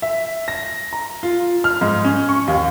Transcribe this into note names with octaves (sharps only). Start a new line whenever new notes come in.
E5
A#6
A#5
F4
F6
G#2
C#4
C#6
D#2